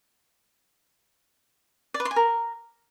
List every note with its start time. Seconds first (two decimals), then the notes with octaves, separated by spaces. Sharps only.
1.94 D5
2.00 B4
2.05 C6
2.11 G#5
2.16 A#4